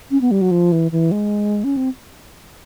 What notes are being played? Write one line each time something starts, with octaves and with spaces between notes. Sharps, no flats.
C#4
B3
G3
F#3
F3
E3
E3
G#3
C#4
C4